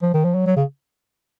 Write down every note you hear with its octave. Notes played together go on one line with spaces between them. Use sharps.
F3
D#3
F3
F#3
F#3
C#3